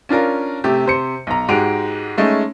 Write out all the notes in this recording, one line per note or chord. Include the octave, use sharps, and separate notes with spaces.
C#4 D4 F4 A#4
C3 A3 G4
C3 C5 C#7
B1 A#5
G#2 G#3 F#4 G4 D7 F7
G#3 A3 C#4 D#4